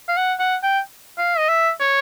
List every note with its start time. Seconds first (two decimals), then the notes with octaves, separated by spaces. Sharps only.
0.09 F5
0.17 F#5
0.39 F#5
0.63 G5
1.18 F5
1.38 D#5
1.49 E5
1.80 C#5